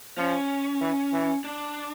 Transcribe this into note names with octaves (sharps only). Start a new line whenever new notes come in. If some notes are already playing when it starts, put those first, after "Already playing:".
F3 C#4
E3
E3
D4